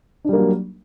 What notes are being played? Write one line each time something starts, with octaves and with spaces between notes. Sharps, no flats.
F#3 G3 A#3 D4